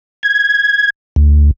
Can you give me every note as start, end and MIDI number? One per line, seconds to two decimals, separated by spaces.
0.23 0.90 92
1.16 1.51 38